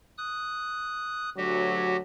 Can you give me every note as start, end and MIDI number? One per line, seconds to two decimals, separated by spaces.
0.18 1.30 87
0.18 1.30 90
1.37 2.01 38
1.37 2.01 54
1.37 1.97 66
1.37 1.97 67